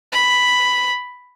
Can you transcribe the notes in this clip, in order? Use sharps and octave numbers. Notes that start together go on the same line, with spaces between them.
B5